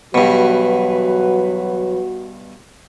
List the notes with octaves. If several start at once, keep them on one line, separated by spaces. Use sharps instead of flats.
G2 B2 E3 F#3 F#4 B4